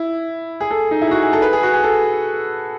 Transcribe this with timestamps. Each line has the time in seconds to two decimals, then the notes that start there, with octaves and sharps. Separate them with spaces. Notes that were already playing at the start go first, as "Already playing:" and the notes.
Already playing: E4
0.60 G#4
0.71 A4
0.91 D#4
1.02 E4
1.07 G#4
1.11 F#4
1.22 G#4
1.33 A4
1.42 B4
1.53 G#4
1.63 F#4
1.73 G#4
1.84 A4